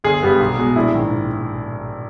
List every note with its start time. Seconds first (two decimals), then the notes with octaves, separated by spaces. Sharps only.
0.04 G1 G#4
0.23 G2 G3 B3
0.40 B1
0.58 B2 G#3
0.76 A#1 E4
0.93 G#2 D#3